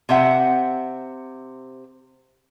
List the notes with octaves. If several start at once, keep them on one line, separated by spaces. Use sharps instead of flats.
C3 C4 E5 F#5